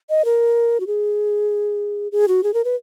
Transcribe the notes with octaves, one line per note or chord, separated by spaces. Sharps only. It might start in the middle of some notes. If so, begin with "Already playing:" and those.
D#5
A#4
F#4
G#4
G#4
F#4
G#4
A#4
B4